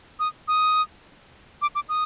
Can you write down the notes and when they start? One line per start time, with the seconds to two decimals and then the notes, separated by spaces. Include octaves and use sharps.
0.19 D#6
0.48 D#6
1.62 D6
1.75 D6
1.89 D#6